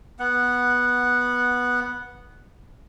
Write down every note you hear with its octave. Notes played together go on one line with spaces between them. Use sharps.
B3 F#5